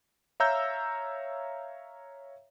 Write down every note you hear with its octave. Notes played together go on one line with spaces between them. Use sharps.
C#5 E5 F5 A#5 E6 G6